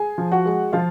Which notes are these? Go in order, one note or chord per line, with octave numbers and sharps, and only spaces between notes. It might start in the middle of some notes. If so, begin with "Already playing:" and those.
Already playing: G#4 G#5
F3
F#4 F#5
G#3
F3 F4 F5